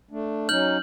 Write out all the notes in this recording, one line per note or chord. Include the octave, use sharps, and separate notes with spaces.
A3 D4
F#3 C#4 D#4 F6 G6 F#7